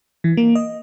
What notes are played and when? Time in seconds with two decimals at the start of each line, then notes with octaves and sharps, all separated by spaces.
0.24 E3
0.37 A#3
0.55 D#5